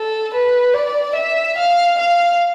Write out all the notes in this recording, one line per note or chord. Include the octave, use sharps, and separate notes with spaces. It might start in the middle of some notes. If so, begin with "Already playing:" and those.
Already playing: A4
B4
D5
E5
F5
F5